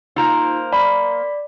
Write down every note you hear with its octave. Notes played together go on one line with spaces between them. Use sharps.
A#3 D#4 F4 A#4 C5
D5 B5